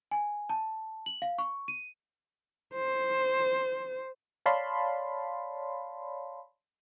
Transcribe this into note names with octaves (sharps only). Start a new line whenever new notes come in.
G#5
A5
F#7
F5
C#6
D#7
C5
C#5 D5 F5 A5 B5 C6